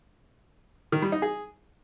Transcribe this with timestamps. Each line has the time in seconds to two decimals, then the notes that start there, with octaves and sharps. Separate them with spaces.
0.92 D#3
1.02 G3
1.12 D#4
1.22 G#4